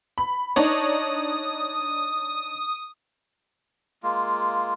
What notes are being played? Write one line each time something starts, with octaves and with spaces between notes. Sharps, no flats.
B5
D4 D#4 C#5 D#6
G#3 A#3 F4